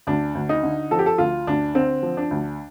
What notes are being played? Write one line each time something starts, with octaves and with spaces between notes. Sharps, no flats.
D2 D4
D2
D#4
D3
F3 A4
G4
A4
D2 F4
D2 D4
D3 C4
F3
D4
D2